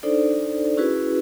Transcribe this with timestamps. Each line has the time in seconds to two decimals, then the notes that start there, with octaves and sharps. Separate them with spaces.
0.03 D4 D#4 A4 C5 D5
0.77 C#4 E4 F#4 G#4 B4